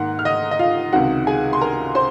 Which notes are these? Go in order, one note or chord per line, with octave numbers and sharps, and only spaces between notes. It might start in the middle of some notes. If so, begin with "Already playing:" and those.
Already playing: G#2 D#3 A#3 F#5 F#6
F6
D#5 D#6
D#5
F4 F5
C#2 C3 D#3 F#4 F#5
G#4 G#5
C6
A#4 A#5
C5 C6